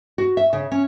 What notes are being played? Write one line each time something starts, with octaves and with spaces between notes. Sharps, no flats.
F#4
E5
C#3
C#4